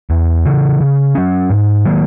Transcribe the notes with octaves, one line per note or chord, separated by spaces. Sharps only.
E2
C#3 E3
C#3
F#3 C#4
G#2
D#3 F#3 A#3